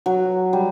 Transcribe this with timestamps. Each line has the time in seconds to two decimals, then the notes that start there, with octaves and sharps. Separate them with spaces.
0.06 F#3
0.53 G3